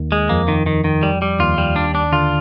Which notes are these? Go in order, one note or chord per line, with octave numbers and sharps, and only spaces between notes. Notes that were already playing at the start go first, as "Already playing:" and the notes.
Already playing: D#2 D#3
G#3
F2 F3 A#3
D#3
D#3
D#3
G3
G3
D#2 D#3 F4
G3
D4
D4
D3 F4